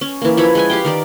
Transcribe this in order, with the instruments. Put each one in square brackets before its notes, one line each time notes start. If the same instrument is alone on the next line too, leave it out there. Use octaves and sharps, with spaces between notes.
[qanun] C#4
E3 A#3
F3 E4 C#5 B5
G#3 B4 G#5
G4 F5 G5
D#3 A#4 D5